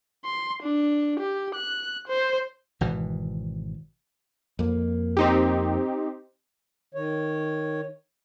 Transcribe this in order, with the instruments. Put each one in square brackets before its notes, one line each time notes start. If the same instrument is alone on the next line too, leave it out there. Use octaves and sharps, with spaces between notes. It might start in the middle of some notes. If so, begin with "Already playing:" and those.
[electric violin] C6
D4
G4
F#6
C5
[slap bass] G#1 B2 E3
[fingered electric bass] F2 A#3
[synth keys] C4 D#4 G4
[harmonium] D#3 C#5